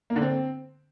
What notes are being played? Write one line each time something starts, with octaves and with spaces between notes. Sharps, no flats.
A#3
D3
C4